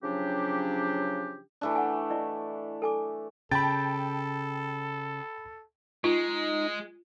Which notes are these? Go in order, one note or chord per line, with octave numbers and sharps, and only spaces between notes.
C#3 F3 F#3 C#4 D4 G4
E3 A3 D4
F#5 G#5
E4 D5 D#5
A4 G#5 D6
C#3 A4 G5 A5 B5 A6
G#3 D#4 F4